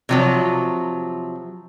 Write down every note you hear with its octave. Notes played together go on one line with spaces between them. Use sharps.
C3 F3 F#3